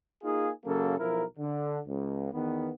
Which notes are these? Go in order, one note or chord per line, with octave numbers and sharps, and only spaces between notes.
A#3 D#4 F4 G#4
F#2 C#3 F#3 A#3 A4
B1 F3 E4 A#4
D3
C#2
E2 D#3 B3